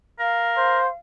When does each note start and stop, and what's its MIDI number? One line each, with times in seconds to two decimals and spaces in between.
0.19 0.79 70
0.19 0.95 77
0.57 0.88 72